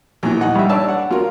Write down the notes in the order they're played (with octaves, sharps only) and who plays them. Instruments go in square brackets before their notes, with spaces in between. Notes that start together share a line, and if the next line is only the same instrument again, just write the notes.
[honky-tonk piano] A#1 D#2 E3 [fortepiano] F#3
[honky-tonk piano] D#4 [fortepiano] F#5
[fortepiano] G2 E5
[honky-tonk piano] D4 C#5 [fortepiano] D5 A5 E6
[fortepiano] F#5
[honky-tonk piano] F#3 A#4 [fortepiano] F4